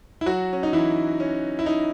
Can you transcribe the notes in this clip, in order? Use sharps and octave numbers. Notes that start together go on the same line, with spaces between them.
E4
F#3 F#4
C#4
D#4
E3 E4
C#4
E4
D#4